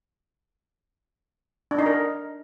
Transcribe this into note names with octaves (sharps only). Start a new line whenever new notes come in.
D4
D#4
A#4